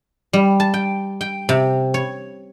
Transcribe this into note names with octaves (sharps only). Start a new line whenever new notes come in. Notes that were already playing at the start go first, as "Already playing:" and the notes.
G3
A5
G5
G5
C3
C#5